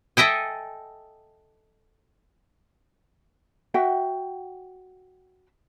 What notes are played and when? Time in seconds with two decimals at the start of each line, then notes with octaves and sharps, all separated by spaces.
0.17 A4 D#5 E5 G5 G#5
3.74 F#4 E5 F#5 G5